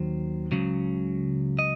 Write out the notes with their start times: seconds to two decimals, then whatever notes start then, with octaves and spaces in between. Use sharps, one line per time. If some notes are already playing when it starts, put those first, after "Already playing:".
Already playing: D#2 D#3 F#3 C5
0.52 C#2 C#3 F#3
1.59 D#5